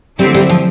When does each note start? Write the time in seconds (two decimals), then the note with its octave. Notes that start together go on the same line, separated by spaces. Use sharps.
0.19 D3 F#3 G3 A3 C4 E4
0.34 G3
0.49 F3